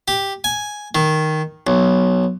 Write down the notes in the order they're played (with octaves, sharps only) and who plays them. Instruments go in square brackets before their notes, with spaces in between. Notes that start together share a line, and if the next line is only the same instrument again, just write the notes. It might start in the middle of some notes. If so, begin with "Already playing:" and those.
[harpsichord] G4
G#5
D#3
B1